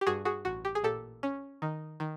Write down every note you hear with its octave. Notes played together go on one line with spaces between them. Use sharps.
G4
G2 F#4 G#4
F#4 G#4
A1 F#4
G4
G#4
A#2 G4 A4
C#4
D#3
D#3